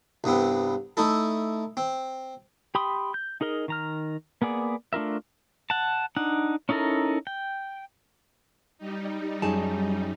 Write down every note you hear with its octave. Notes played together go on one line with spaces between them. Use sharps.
C2 G2 B3 C4
A3 D#4 E4 A4
C4
G4 G5 B5 C6 D#6
G6
D#4 G#4 A#4 D#5
D#3 A#5 F6
A#3 B3 G#4 D5
A3 D4 F4 A#4 E5
F#5 A5
D4 D#4 F#5
C#4 D#4 E4 A4 A#4
G5
G3 D#4
F#2 G#4 A5